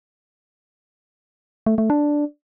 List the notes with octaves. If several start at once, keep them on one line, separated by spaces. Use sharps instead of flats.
A3
A3
D4